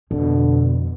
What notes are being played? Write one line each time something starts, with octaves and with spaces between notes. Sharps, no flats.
F2 B2 D3